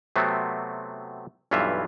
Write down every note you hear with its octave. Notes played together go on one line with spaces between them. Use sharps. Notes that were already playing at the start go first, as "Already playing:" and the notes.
C3 F#3 A3 B3 C4
B1 G2 E3 F4 E5